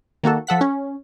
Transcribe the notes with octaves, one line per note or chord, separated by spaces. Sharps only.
D#3 A#3 F#4 A4
F3 A4 F#5 B6
C#4